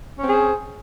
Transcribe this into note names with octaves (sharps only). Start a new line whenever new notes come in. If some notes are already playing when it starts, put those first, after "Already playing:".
C4 C#4 G#4 C5